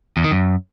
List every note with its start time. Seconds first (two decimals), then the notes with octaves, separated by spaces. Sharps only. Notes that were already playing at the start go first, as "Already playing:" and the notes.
0.17 E2
0.24 D#3
0.31 F#2